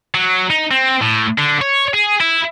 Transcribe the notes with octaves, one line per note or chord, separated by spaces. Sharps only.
F#3
D#4
C4
A2
D3
C#5
G#4
E4